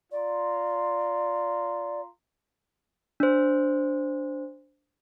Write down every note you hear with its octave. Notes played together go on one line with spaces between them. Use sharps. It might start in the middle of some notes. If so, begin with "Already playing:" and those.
F4 D5 A#5 C6
D4 C5